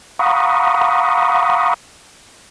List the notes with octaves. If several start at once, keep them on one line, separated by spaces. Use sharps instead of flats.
F5 F#5 A#5 B5 C#6 D#6